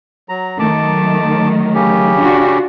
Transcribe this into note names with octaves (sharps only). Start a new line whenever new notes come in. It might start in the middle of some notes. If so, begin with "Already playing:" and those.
F#3 A#5
D#3 F#3 A3 A5 D6
C#3 C#4 G4
D4 F4 F#4